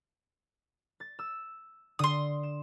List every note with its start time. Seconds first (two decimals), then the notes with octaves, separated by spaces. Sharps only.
1.00 A6
1.19 E6
1.99 D3 C6 D#6
2.43 E7